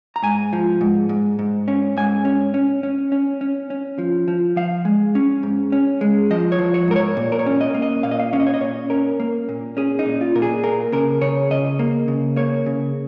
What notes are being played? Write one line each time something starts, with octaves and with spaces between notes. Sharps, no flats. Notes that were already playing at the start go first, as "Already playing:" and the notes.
A#5
G#2 G#5
F3
G#2
G#2
G#2
C#4
G#2 G#5
C#4
C#4
C#4
C#4
C#4
C#4
F3
F3
F3 F5
G#3
C#4
G#2
C#4
G#3
F3 D#5
C#5
F3
C#5
G#2 A#4
C#5
A#2
A#4
C#5
C#4
D#5
A#3
D#5
A#2 F5
D#5
F5
C#4 F5
D#5
C#5
D#5
A#2 C#5
C#4 A#4
A#3
A#2
C#4 G#4
D#4
A#2
F4
A#2 A#4
G#4
A#3 A#4
C#3 A#4
C#3 C#5
C#3 D#5
A#3
C#3
A#3 C#5
C#3